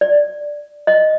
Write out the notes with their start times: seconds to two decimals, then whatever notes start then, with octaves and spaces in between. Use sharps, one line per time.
0.01 D5
0.87 D#5